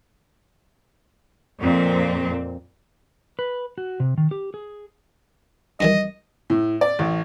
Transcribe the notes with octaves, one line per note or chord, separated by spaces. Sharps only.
F2 A#2 C4
B4
F#4
C3
D#3
G4
G#4
G2 D#3 E3 D#5
A2
D5
A1